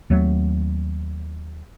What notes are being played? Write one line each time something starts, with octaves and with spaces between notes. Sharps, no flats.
D#2 F#3 A3 C4